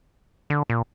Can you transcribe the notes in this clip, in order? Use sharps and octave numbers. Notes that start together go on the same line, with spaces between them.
D3
A#2